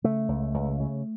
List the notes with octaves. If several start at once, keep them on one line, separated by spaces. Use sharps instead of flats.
C#3 A3
C#2
C#2
C#3